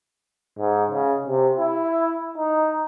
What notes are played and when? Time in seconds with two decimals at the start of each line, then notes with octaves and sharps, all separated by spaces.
0.59 G#2
0.90 C#3
1.27 C3
1.59 E4
2.38 D#4